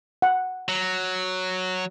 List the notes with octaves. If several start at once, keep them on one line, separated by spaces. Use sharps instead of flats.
F#5
F#3